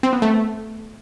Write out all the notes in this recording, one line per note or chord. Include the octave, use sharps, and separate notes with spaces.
C4
B3
A3